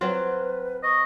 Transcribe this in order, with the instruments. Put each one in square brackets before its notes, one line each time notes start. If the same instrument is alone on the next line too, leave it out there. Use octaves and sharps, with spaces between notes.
[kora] F#3 C4 F4 [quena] B4
[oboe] D#5 [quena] C#6